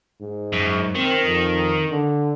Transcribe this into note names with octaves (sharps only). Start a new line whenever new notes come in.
G#2
F#2
D#3 C4
F2
D3